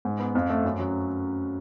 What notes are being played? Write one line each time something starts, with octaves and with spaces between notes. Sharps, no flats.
G#2
B3
F2
A3
F#2
F#3